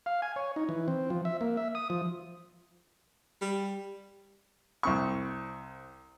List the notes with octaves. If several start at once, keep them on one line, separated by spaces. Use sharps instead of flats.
F5
G#5
C#5
D#4
E3
C4
F3
E5
A#3
E5
D#6
F3
G3
C2 C4 C#6